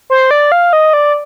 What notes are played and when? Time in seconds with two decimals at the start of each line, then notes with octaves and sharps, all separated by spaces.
0.10 C5
0.31 D5
0.52 F5
0.73 D#5
0.93 D5